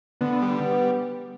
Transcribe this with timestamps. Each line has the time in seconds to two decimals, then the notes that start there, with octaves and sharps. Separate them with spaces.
0.21 D3 B3
0.42 G3